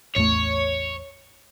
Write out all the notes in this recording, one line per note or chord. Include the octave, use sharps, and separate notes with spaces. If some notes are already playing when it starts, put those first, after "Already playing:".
A1 E2 A3 C#5